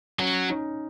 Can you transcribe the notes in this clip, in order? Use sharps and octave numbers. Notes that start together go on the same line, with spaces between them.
F#3 C#4
D#4